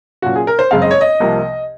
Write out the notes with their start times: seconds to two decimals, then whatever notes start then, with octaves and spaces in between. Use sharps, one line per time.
0.22 A#2 F#3 C#4 F4 F#4
0.36 G#4
0.47 A#4
0.59 C5
0.71 F#1 F#2 C#3 G#3 C4 F5
0.82 D#5
0.91 C#5
1.01 D#5
1.20 C2 C3 F3 A#3